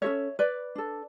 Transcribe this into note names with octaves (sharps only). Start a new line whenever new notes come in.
C#4 F#4 A4 C#5 E5
B4 D5
D4 A4